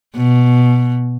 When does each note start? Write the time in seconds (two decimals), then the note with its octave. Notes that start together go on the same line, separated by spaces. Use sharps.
0.16 B2